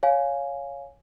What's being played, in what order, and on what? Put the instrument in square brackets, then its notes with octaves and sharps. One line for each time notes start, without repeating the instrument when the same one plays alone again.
[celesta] C#5 F5 G#5